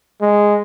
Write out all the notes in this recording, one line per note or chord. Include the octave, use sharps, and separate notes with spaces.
G#3